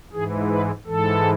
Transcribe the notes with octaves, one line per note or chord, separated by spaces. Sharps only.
G#2 E3 G#4
B4
G#2 E3 A4